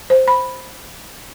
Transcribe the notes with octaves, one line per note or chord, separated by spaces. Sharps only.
C5
B5